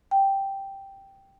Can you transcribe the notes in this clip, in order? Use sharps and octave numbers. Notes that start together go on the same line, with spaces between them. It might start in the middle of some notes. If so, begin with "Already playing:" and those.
G5